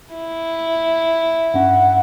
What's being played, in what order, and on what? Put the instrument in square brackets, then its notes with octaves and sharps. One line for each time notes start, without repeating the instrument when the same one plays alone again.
[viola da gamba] E4
[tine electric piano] G2 C#4 [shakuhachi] F#5